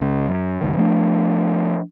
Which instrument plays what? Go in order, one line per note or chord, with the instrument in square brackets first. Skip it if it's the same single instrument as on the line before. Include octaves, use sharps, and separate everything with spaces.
[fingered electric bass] C#2 C#3
F#2
F#1 C#2 D#3
F3 A3 D4